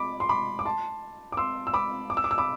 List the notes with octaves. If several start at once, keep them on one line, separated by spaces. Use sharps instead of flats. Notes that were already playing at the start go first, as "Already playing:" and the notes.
Already playing: B5 D6
C6
B5 D6
D6
A5 C6
D6
C6 E6
E6
B5 D6
D6
E6
D6
E6
B5 D6